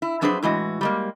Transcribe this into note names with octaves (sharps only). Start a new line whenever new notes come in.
E4
F2 F#3 D4 G#4 B4 C5
A2 E3 G#3 F#4
G3 G#3 A#3